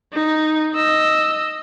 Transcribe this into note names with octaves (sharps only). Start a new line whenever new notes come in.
D#4
D#5 E6